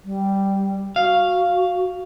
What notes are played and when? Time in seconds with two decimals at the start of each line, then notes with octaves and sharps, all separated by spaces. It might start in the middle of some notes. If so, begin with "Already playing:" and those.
0.05 G3
0.96 F#4 F5